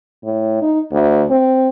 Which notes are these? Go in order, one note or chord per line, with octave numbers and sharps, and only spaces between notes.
A2
D#4
D2
C4